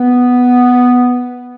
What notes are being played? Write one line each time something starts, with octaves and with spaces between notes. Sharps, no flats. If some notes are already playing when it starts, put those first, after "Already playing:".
Already playing: B3